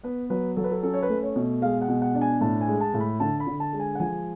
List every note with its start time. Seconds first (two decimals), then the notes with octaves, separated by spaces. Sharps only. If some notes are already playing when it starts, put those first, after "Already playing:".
0.03 B3 B4
0.30 F#3 B4
0.57 F#3 A4
0.64 B4
0.72 A4
0.83 C#4 A4
0.94 C#5
1.03 B4
1.09 A3
1.23 C#5
1.36 B2
1.62 G#3 F5
1.82 F#5
1.89 B2
2.02 F#5
2.15 D4
2.21 G#5
2.41 A2 A5
2.61 G#5
2.68 G#3
2.81 A5
2.94 A2
3.00 B5
3.20 D3 A5
3.40 B5
3.47 D3
3.60 A5
3.73 G#3
3.80 G#5
3.95 F#5
4.00 F3 G#5